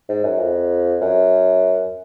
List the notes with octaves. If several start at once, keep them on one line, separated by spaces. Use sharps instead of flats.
G#2
F#2
F2
F#2